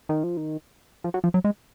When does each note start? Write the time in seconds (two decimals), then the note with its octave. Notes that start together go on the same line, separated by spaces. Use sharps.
0.09 D#3
0.23 F3
0.37 D#3
1.04 F3
1.14 F#3
1.24 F3
1.34 F#3
1.44 G#3